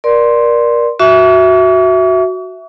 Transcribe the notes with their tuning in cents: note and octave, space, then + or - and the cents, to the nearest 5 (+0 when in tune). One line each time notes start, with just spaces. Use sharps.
A#4 +25 D5 +10 C6 +0
F#4 +0 E5 +0 C#6 +45